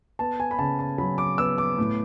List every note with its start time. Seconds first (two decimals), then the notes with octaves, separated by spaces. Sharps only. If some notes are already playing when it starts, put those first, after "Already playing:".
0.19 B3 A5
0.40 G#5
0.51 B5
0.58 C#3 A5
0.79 A5
0.98 F#3 B5
1.18 D6
1.38 B3 E6
1.58 D6
1.78 A2